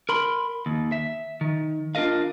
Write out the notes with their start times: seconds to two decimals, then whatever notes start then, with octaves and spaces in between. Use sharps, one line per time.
0.09 A#4 B5 C6
0.66 D#2
0.92 E5
1.41 D#3
1.95 D4 F4 A#4 D#5 F5